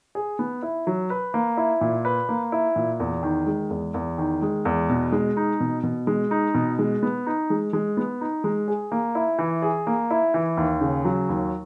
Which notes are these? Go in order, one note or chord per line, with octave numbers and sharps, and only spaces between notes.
G#4
B3
E4
F#3
B4
A#3
E4
A#2
B4
A#3
E4
A#2
E2
D#3
G#3
E2
E2
D#3
G#3
E2
B2
G#3
D#4
B2
B2
G#3
D#4
B2
G#3
B3
D#4
G#3
G#3
B3
D#4
G#3
G#4
A#3
E4
E3
G#4
A#3
E4
E3
D#2
C#3
F#3
D#2